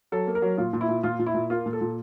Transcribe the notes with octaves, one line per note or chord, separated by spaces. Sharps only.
F#3 A4
A#3
A#4
F#3
A#2 F4
A#2
E4
A#2
A#2 F4
A#2
E4
A#2
A#3 F4
A#2
A4
A#2